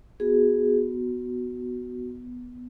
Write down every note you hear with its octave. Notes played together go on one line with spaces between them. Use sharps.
B3 F#4 G#4